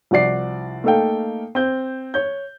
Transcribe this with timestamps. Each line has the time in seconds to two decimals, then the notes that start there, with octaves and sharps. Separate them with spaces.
0.11 C2 F3 F#4 D5 C7
0.84 A3 A#3 D#4 A4 F5 G5
1.55 C4 G6
2.14 C#5 G6